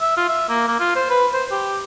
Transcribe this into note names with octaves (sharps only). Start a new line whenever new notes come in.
E5
F4
E5
A#3
A#3
F4
C5
B4
C5
G4